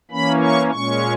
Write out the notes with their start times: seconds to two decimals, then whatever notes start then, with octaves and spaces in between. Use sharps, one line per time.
0.11 E3 A#3 C#4 B5
0.42 C#6
0.71 A#2 G#3 C#4 C#6